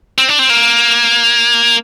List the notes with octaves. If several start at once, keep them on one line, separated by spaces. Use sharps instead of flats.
C4
D4
C4
A#3